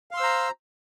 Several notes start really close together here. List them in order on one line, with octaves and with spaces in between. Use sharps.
F5 C6 E6 C5 A#5